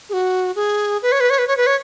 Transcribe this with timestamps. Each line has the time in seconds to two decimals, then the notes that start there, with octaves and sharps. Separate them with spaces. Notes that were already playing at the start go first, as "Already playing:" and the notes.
0.10 G#4
0.13 F#4
0.56 G#4
1.02 B4
1.12 C#5
1.20 B4
1.30 C#5
1.38 B4
1.48 C#5
1.57 B4
1.67 C#5